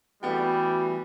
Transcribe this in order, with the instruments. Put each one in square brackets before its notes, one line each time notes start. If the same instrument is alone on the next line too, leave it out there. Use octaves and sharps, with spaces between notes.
[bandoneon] E3 [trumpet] G3 [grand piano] A3 B3 G5 [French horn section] F#4